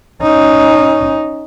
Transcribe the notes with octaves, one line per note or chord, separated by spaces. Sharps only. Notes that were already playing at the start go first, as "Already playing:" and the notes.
C#4 D#4